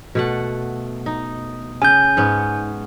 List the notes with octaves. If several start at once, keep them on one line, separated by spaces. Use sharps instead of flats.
B2 A3 F#5
D#4
C#3 G#5 G6
G#2 B3 C#4